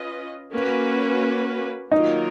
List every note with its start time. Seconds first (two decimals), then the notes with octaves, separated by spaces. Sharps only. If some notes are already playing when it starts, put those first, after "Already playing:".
Already playing: C#4 F4 B4 D#5
0.54 A#3 C#4 F#4 B4
1.91 D#3 F#3 A#3 D#4 F4 A#4